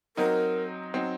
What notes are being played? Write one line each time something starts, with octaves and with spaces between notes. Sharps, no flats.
F#3 C4 D#4 A#4
F#3 C4 D#4